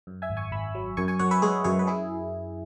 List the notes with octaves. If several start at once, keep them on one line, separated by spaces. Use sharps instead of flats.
F#2
E5 G#5
G#1
G#5 C#6
G#1 B5 E6
F#3
F#2 G#5 C#6
G#5 C#6
F#2 C#5 F#5
B4 E5
G#3 G#4 C#5
F#2 G#4 C#5
B4
E4 G#4